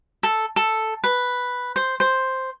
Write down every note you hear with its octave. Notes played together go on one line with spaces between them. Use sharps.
A4
A4
B4
C5
C5